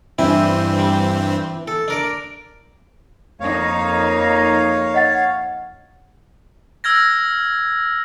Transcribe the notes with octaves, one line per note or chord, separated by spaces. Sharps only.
G2 E3 C4 D4 E4
G3
A4
D4 A#4 D5
F2 A#3 D#4 C#5 F5
D#5 F#5 A6
E6 F6 G#6 A#6